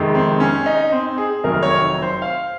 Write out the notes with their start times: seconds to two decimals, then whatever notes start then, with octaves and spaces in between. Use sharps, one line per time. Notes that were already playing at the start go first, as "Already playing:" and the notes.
Already playing: F2 C3 D#3 G#3
0.15 C4
0.40 C#4
0.66 D#4
0.92 C4
1.18 G#4
1.43 F1 F2 D#3 F#3 A#4
1.62 C#5
2.02 C5
2.22 F5